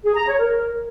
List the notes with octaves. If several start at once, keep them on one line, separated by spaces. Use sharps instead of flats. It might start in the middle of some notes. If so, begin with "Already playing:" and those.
G#4
A#5
C#5
A#4